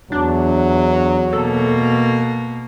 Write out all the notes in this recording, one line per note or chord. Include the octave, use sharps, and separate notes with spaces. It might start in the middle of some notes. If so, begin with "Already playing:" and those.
E2 F#3 D4
B2 A#3 A4